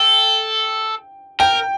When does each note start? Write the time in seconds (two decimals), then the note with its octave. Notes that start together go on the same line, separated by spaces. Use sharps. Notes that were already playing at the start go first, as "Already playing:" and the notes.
Already playing: A4 G5
1.40 A#4 G5